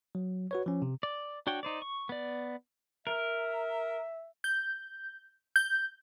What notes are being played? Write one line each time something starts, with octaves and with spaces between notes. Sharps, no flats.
F#3
F#4 B4 C#5
F3 C#4
C3
D5
D4 F#4 C#5 G5
D#4 C5 D5
C#6
B3 D5
A#4 E5
G6
G6